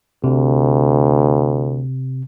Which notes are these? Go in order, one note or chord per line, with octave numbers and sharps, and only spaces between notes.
D2 C3